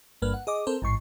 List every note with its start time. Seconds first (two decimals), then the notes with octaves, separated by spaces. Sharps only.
0.22 G1 G2 A#3 B4 F6
0.34 F#5
0.47 G#4 D#5 D6
0.67 C4 A4 A#4 C5
0.82 A1 G#2 C#6 C7